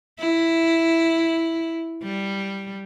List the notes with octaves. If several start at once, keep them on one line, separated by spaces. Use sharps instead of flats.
E4
G3